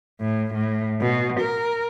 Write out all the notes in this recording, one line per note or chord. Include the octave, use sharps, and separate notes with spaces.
A2
A2
B2
A#4